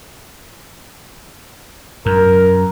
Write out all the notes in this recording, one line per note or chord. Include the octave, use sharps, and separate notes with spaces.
F#2 A#4